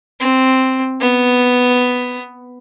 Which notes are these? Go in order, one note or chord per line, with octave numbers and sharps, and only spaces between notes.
C4
B3